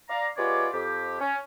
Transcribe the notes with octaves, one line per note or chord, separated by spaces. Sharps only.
D5 F5 A#5
G#3 B3 F4 G4 C#5 D5
F2 G4
C#4